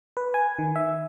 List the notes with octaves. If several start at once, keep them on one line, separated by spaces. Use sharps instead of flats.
B4
G#5
D#3
E5